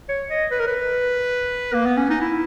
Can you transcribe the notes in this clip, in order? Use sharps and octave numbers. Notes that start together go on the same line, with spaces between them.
C#5
D#5
B4
A#4
B4
A#3
B3
C#4
D#4
E4